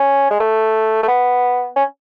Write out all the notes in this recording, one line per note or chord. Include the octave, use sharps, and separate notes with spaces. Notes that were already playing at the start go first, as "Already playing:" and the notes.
Already playing: C#4
G#3
A3
A3
B3
C#4